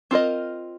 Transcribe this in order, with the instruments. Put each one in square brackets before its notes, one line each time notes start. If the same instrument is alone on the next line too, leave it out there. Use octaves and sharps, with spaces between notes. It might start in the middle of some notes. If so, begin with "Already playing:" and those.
[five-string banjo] C4 F4 A#4 D#5